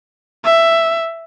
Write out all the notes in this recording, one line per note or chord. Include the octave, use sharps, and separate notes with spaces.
E5